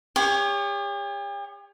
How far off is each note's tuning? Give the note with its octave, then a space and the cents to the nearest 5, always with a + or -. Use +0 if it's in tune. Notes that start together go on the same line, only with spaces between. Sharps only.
G4 +45 C#5 +20